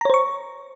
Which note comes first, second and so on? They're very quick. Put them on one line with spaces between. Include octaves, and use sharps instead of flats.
A#5 C#5 C5 C#6